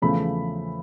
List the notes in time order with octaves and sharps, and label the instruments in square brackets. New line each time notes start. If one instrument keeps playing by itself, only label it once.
[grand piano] E2 C#3 F3 A3 B5